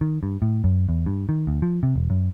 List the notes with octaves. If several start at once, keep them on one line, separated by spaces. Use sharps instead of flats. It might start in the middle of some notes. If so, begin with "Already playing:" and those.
D#3
G2
A2
F#2
E2
G2
D#3
D2
F3
C3
E1
F#2